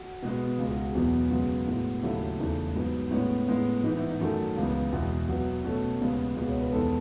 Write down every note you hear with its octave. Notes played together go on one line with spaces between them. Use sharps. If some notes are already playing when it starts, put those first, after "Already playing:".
Already playing: F#4
B2 G#3 B3
C#2 C#3 G#3 G#4
F#4
G#4
E2 B2 F#3 B3
F#2 C#3 G#3 B3 F#4
A2 G#3 B3
D#2 C#3 F#3 A3 E4
E2 C#3 E3 A3 D#4
G#2 F#3 B3
A2 G#3 B3 C#4
A2 G#3 B3
G#2 E3 B3 D#4
E4
D#4
F#2 D#3 F#3 A3
C#2 C#3 E3 G#3 B3
E2 B2 G#3 B3 E4
B2 F#3 B3
B2 A3 C#4
D#2 C#3 G#3 B3
C#2 B2 G#3 B3 G#4
C#5
B4
E2 D#3 G#3 B3 A4